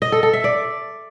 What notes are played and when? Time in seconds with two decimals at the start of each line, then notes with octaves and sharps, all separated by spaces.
0.02 D#5
0.12 A4
0.23 A4
0.33 E5
0.44 D5